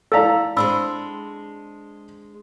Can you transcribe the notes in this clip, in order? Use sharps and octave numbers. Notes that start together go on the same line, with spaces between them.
E4 A4 D5 F5 A#5 E6
G#3 C4 D4 B5 E6